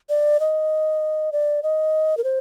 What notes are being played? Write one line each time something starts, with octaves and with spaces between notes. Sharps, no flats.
D5
D#5
D5
D#5
A#4
C5